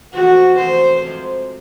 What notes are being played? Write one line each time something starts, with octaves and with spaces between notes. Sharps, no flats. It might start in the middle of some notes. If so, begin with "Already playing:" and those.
E2 C3 F3 A3 F#4
E2 C3 F3 A3 C5
C3 F3 G#3